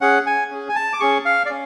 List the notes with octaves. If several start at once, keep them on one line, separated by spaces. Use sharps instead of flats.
C#4 G#4 F#5
G#5
C#4 G#4
G#5
A5
D6
C#4 G#4 C#6
F5
D5
C#4